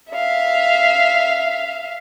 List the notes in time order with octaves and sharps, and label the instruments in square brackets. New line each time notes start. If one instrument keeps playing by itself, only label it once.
[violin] E5 F5